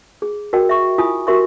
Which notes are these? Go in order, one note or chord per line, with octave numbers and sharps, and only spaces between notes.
G#4
F#4 A#4 D#5 G5
E5 C#6
E4 F4 G#5 D#6
F#4 G4 A#4 E5 C6 C#6